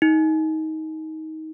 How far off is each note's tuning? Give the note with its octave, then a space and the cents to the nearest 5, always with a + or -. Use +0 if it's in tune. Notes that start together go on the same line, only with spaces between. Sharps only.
D#4 +20